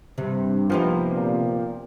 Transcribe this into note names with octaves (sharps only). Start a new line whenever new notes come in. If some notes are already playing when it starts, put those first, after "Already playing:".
G2 C3
F3 A#3 B3 D#4 G4 C5
A#2